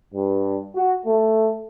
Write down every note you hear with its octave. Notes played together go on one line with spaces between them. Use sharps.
G2
F#4
A3